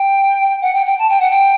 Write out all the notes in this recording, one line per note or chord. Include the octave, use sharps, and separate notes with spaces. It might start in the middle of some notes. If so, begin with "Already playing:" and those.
Already playing: G5
F#5
G5
G5
A5
G5
F#5
G5